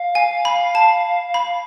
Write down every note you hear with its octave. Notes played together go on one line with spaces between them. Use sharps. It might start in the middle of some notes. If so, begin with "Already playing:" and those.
Already playing: F5
G#5
B5
A5
B5